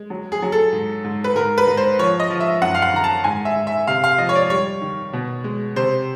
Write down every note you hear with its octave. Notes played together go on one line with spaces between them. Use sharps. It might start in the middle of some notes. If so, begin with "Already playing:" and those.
Already playing: G#3
F#3
G#4
F#3
A4
G#2
G#2
B4
G#2 A#4
B4
G#2
C5
F3 C#5
D#5
F3
E5
F#2 F#5
F5
F#5
D#3 A#5
A5
G#2 G#5
E5
G#2
E5
C3 F5
F5
F3 D#5
C#5
D5
G3 C#5
D#3
B2
G#3
C3 C5